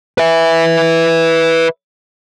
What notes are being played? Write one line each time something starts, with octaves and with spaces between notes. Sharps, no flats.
B4 E5